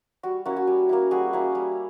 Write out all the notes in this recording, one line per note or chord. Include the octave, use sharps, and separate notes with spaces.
G3 F#4
A#3 C#4 E4 F#4
F#4
G3
A#3 C#4 E4
G3 F#4 G#4
A#3 C#4 E4
G3